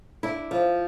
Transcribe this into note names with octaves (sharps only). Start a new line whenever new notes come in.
D4 E4
F3